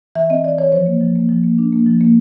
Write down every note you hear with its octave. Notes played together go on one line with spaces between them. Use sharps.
E3 E5
C4 D#5
E3 D5
E3 C#5
F3 C5
A#3
F3
A#3
F3
A#3
D4
A#3
F3
A#3